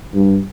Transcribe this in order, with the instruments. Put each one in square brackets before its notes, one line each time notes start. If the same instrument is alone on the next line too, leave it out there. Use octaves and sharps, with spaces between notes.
[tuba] G2